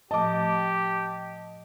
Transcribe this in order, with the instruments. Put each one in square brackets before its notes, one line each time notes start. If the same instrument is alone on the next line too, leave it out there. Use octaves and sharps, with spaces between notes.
[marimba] A2 F3 A3 [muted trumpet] G4 [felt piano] D#5 D6 [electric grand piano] A5